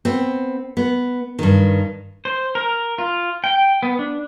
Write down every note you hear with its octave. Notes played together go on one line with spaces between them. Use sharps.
B3 C4
B3
G2 D#3
C5
A#4
F4
G5
B3
D4